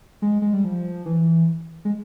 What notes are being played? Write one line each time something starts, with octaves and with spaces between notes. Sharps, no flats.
G#3
G#3
G3
F3
E3
G#3